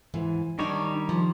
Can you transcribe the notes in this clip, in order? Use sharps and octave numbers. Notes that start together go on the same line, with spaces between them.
G#2 E3
D#3 G3 D4 D#4 C#5
F3